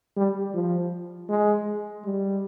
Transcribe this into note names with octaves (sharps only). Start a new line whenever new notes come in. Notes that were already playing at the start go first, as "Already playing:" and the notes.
G3
F3
G#3
G3